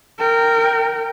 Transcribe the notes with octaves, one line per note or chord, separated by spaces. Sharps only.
A#4 G5